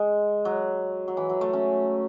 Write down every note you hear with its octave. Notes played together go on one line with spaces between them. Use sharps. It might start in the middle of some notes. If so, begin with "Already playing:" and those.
Already playing: G#3
F#3
F#3
E3
F#3
A3
C#4